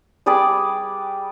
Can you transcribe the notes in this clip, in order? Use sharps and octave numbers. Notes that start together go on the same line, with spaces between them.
G3 G#4 B4 D5